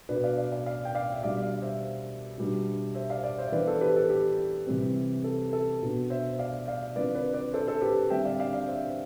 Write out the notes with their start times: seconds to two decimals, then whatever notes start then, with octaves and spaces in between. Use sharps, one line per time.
0.09 B2 B3 D4 B4 D5
0.24 D5 F5
0.37 D5 F5
0.52 D5 F5
0.66 D5 F5
0.85 G5
0.95 D5 F5
1.12 E5
1.23 B2 G3 D4 D5 F5
1.42 D5 F5
1.62 C5 E5
2.38 B2 G3 B3 D4
2.95 C5 E5
3.10 D5 F5
3.24 D5 F5
3.38 C5 E5
3.52 E3 B3 D4 B4 D5
3.67 A4 C5
3.81 G4 B4
3.96 A4
4.10 G4
4.66 C3 E3 G3 C4
5.24 A4
5.53 A4
5.82 B2 B3 D4
6.10 C5 E5
6.39 D5 F5
6.68 D5 F5
6.96 D3 F3 C4 B4 D5
7.15 B4 D5
7.34 B4 D5
7.53 A4 C5
7.67 A4 C5
7.82 G4 B4
8.10 D3 G3 C4 E5 G5
8.25 D5 F5
8.40 D5 F5
8.53 D5 F5
8.67 C5 E5